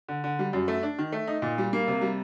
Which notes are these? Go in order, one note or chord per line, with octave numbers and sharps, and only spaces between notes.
D3
D3
G3
F#2
A3
D4
D#3
A3
D#4
A#2
G3
A#3
C3
G3